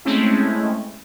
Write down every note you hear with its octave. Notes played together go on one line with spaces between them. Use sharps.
G#3 A3 C4 C#4 E4